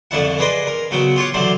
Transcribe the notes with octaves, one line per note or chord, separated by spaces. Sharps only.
C2 F2 D3 F3 E4 F#5
G#4 B4 D5 D#5 C6 D#6
A#4
C#3 F#3 B3 G5
F4 G4 C#5 F#5
D3 E3 F#3 G4 C5